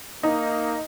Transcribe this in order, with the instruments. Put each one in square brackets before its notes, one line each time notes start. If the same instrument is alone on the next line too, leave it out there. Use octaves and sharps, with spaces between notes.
[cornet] A#3 [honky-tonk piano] D#4